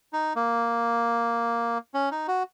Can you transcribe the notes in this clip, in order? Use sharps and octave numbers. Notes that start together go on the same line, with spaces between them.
D#4
A#3
C#4
D#4
F#4